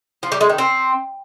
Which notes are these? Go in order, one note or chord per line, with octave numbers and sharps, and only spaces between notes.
F3
G3
G#3
D#3
C4